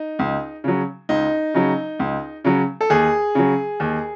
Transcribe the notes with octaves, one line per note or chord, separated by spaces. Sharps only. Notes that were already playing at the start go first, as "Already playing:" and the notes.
Already playing: D#4
C#2
C#3 F#3
C#2 D#4
C#3 F#3
C#2
C#3 F#3
A4
D#2 G#4
C#3 F#3
D#2